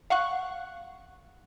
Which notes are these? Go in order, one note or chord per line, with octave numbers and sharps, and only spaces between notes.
F5 F#5 C#6 F#6